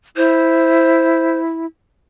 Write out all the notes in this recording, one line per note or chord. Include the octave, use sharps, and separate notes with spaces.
E4 C5